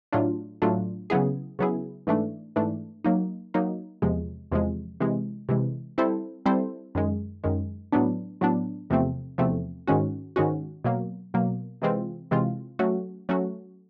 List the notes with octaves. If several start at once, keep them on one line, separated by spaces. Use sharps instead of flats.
A2 F#3 A3 D4 F4
A2 F#3 A3 D4 F4
C#3 F#3 B3 E4 G#4
C#3 F#3 B3 E4 G#4
G#2 E3 A3 D4
G#2 E3 A3 D4
F#3 A#3 D#4
F#3 A#3 D#4
E2 C3 F3 G#3
E2 C3 F3 G#3
C3 E3 G#3
C3 E3 G#3
G3 C4 E4 A4 C5
G3 C4 E4 A4 C5
F#2 D#3 G#3
F#2 D#3 G#3
A2 F#3 B3 D4
A2 F#3 B3 D4
E2 C3 F3 A3 C4
E2 C3 F3 A3 C4
G#2 D#3 G#3 C#4 F#4
G#2 D#3 G#3 C#4 F#4
B2 F#3 A#3
B2 F#3 A#3
C3 E3 G#3 C4 F4
C3 E3 G#3 C4 F4
F#3 A3 C#4 F#4
F#3 A3 C#4 F#4